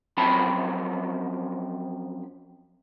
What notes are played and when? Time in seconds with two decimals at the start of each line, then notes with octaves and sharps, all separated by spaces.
0.17 F#2 F3 F#3 C4 A5 B5